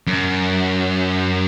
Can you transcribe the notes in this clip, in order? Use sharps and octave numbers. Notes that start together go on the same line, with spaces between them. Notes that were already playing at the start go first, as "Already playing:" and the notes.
F#2